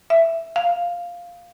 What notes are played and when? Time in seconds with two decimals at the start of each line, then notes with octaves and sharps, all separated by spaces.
0.10 E5
0.56 F5